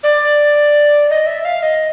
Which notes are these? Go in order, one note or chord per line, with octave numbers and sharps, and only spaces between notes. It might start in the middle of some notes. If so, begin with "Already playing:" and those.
D5
D#5
E5
F5
D#5